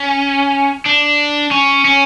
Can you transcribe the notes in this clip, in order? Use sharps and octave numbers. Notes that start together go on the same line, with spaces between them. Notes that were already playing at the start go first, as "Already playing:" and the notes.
Already playing: C#4
D4
C#4
C#4